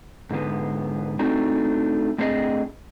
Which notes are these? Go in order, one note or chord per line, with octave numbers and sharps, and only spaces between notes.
G#2 D3 B3
A3 C4 D4 D#4 F#4
A2 C4 D4 G#4 B4 D#5